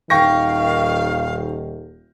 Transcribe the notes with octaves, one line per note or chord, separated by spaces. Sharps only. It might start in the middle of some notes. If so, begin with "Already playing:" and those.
D#1 D#3 F5 G5 C#6 A#6